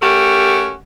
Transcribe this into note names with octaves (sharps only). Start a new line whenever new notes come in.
A3 C#4 F#4 G4 A#4